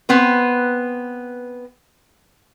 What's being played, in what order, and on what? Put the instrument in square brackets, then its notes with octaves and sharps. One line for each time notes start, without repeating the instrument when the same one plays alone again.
[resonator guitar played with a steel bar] B3 C4 B4